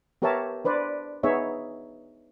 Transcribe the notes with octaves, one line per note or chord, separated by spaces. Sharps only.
B3 G4 A#4 C#5 E5 A5
D4 B4 C5 D5
B3 D#4 G#4 C#5 E5